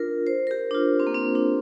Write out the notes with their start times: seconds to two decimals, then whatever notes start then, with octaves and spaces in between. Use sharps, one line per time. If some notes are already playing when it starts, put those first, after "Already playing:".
Already playing: D4 F4 A#4
0.27 C5
0.47 A#4
0.51 G4
0.71 D4
0.75 F4
1.00 C4
1.07 A#3
1.15 C4
1.35 D4